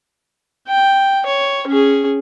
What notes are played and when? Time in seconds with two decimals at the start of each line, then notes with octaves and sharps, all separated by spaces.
0.68 G5
1.26 C#5
1.67 C#4 G#4